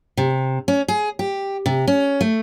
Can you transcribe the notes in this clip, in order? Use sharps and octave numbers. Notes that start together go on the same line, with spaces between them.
C3
C#4
G#4
G4
C3
C#4
A3